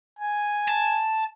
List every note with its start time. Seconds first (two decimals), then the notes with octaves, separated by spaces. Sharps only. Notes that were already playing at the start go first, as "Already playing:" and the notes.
0.19 G#5
0.68 A5